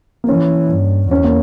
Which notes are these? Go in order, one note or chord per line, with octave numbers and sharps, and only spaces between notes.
A#3
E3 C#4
G2
E2 C#4
A#3